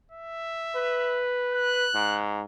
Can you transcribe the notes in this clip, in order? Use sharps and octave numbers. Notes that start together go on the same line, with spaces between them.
E5
B4
F#6
G#2